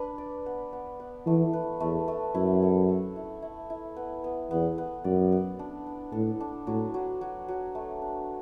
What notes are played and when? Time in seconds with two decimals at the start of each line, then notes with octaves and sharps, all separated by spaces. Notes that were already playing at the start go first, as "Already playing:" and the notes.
Already playing: D4 B4
0.18 D5
0.46 B3
0.73 B3
1.00 B3
1.26 E3 A3
1.53 B4
1.80 E2 A3
2.08 A3
2.34 F#2 E4
2.62 A4
2.89 A4
3.16 E4
3.42 E4
3.70 E4
3.96 B3
4.24 B3
4.51 E2 B3
4.78 B3
5.04 F#2 D5
5.32 B3
5.59 D4
5.87 D4
6.12 A2 A4
6.40 D4
6.67 A2 F#3
6.94 F#3
7.21 F#3
7.48 F#3
7.75 A3
8.02 D4